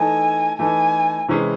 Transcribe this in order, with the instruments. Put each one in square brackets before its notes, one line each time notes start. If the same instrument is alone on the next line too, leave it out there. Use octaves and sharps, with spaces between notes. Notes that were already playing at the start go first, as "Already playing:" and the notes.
Already playing: [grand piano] E3 A3 D#4 A4 [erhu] G#5
[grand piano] E3 A3 D#4 A4 [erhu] G#5
[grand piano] C3 E3 G#3 C#4 G#4